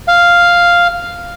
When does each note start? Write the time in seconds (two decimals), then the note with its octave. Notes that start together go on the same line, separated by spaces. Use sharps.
0.08 F5